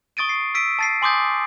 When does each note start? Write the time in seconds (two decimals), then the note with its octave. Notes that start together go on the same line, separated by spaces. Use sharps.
0.17 C#6 D#6 A6 D7 D#7
0.29 C7
0.55 E6 B6 D7 D#7
0.79 A5 A6 C7
1.02 G#5 C6 D6 D#6 G6 A6